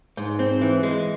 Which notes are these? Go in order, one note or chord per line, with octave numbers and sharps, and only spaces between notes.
G#2
C4
E3
G#3